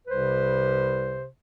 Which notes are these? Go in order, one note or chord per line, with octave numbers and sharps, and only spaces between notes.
C2 C3 B4 C5